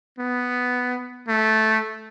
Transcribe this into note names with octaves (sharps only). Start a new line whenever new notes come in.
B3
A3